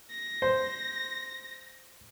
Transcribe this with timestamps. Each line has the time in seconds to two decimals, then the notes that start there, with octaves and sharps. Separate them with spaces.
0.11 A#6
0.42 C5